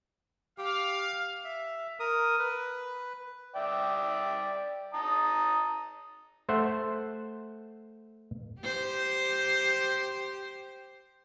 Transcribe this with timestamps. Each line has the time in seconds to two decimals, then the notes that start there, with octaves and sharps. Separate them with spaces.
0.58 G4 F5
1.45 E5
2.00 A#4 D#6
2.39 B4
3.54 D5 E5 G5
4.94 A5 A#5 D#6
6.49 A3 C5 E5 F#5
8.61 G4 C5